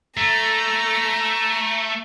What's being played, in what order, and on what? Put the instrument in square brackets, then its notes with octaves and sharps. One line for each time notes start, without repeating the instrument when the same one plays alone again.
[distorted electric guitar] A3 [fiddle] A#5